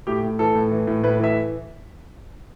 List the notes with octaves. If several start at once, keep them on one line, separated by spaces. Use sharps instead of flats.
A2 G4
A2
E3 A4
A2
E3
A2
A2 B4
E3 E5